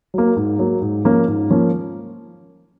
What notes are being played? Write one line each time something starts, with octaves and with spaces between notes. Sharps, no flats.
F#3 A#3
G#2
F#3 A#3
G#2
F3 A#3 C#4
G#2
F3 A#3 C#4